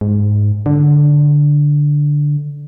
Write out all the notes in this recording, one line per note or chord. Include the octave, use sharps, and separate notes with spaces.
G#2
D3